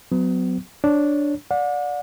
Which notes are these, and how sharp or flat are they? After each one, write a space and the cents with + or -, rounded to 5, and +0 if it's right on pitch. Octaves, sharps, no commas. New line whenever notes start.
F#3 +0 B3 +35
D4 +0 C#5 +0
D5 -5 F#5 -40